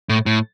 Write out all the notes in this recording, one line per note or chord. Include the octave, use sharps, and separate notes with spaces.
A2
A2